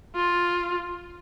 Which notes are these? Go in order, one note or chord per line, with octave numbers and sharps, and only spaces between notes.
F4